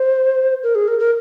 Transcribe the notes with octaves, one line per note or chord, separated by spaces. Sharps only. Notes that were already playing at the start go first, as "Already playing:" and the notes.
Already playing: C5
A#4
G#4
A#4
A#4